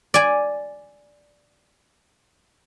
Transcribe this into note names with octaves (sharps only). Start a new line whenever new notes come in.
D5 G#5